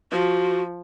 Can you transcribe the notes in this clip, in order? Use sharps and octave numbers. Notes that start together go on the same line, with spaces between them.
F3 F#4